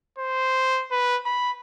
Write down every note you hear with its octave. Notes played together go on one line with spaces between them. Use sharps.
C5
B4
B5